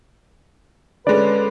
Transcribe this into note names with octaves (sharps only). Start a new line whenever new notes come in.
D3 G#3 C#4 B4 D5